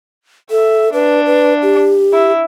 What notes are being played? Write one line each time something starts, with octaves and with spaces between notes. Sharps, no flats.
A4 E5
D4 B4
B4
G4
E4